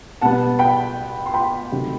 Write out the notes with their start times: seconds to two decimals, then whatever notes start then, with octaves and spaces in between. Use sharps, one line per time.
0.21 B2 G3 B3 F#5 A5
0.59 G5 B5
1.26 C6
1.34 G5 B5
1.72 C3 D#3 F#3 A3 C4